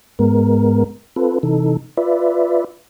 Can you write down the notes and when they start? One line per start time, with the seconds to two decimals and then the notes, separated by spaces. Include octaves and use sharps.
0.19 G#2 G#3 B3 A#4
1.16 C4 F4 A4 B4
1.43 C3 E3 D#4 A4
1.97 F4 B4 D5 E5